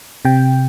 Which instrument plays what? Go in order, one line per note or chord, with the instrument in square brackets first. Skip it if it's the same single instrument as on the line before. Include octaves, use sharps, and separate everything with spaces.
[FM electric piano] C3 G5